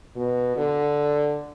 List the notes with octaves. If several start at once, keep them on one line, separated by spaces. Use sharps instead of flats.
B2
D3